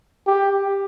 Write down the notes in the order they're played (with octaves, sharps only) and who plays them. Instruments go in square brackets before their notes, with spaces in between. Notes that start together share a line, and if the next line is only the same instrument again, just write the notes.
[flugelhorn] G4